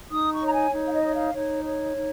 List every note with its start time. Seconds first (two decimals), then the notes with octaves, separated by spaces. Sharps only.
0.10 D#4 D#6
0.31 C#6
0.41 C#5 A#5
0.52 G#5
0.72 D#4
0.86 F5
0.93 D#5
1.03 C#5
1.14 F5
1.34 D#4 C#5
1.65 C#5
1.96 D#4